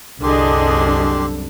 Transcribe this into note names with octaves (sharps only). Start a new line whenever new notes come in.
C2 F#2 D3 D4 G4 G#4 D#5 C6